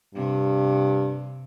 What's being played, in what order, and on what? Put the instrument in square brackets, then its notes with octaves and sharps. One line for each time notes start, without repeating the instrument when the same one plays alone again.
[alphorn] G2 [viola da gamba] C3